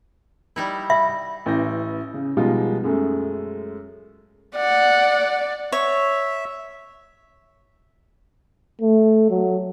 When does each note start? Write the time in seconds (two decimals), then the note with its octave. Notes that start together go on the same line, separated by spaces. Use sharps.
0.56 G3 D#4 E4
0.90 E5 B5
1.46 A1 E3 G6 A#6
2.14 C#3
2.37 B2 F3 G3 G#3 D#4 F4
2.84 F#2 G#3 A3
4.56 D5 F#5
5.72 C#5 E5
8.82 A3
9.30 F#3